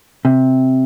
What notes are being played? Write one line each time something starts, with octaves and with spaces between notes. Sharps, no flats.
C3